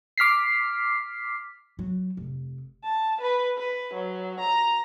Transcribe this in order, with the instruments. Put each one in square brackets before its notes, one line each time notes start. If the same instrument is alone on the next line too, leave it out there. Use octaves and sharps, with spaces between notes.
[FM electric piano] D6 F6 B6 C7
[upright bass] F#3
F1
[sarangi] A5
B4
B4
F#3
A#5